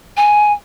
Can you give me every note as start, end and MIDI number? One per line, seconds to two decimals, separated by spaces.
0.17 0.53 80